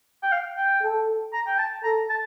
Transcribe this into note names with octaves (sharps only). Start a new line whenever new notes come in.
G5
F5
G5
A4
A#5
G5
A5
A4 A#5
A5